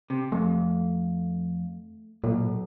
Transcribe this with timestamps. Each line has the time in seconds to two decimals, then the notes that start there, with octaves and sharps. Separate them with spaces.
0.10 C3
0.32 F2 A3
2.24 B1 A#2